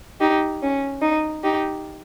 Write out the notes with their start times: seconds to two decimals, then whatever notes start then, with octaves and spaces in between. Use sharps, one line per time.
0.20 D#4 G4
0.62 C#4
1.02 D#4
1.43 D#4 G4